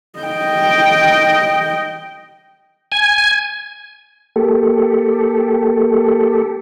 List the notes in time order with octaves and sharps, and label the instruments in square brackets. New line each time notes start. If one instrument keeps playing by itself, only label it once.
[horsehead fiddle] D#5 G5
[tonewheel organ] G#5
A#3 G4 A4